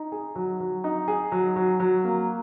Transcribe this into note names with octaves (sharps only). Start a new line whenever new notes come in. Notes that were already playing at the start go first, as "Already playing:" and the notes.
Already playing: D#4
G#4
F#3
F#3
D#4
G#4
F#3
F#3
F#3
A#3